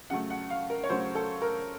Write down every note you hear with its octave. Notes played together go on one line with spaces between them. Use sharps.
C#3 F#3 A3 F#5
F#5
F5
A#4
C#5
C#3 F#3 A3 C5
A4
A#4